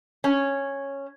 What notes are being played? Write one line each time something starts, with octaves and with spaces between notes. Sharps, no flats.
C#4